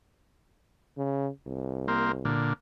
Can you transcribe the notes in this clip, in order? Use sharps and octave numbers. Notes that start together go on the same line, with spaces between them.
C#3
C2
A#3 C4
A#2 D3